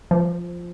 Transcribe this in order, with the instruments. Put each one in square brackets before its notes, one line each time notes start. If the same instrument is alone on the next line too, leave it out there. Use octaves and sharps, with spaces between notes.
[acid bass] F3